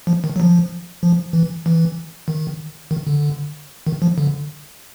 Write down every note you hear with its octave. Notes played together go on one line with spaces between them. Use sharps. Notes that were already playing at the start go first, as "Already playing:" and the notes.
F3
D#3
F#3
F3
F3
E3
E3
D#3
D#3
D3
D#3
F3
D3